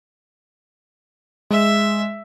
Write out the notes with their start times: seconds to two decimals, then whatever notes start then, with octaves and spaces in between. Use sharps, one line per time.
1.50 G#3 E5